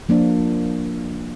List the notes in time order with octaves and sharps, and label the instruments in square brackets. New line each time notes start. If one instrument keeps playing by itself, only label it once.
[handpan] F3 A#3 D4